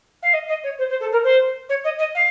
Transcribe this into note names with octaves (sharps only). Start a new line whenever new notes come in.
F5
D#5
D#5
C#5
C5
C5
A4
A#4
C5
C#5
D#5
D#5
F5